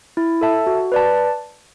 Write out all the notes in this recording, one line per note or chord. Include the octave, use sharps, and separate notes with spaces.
E4
A4 E5 A5
F#4
B4 D5 A5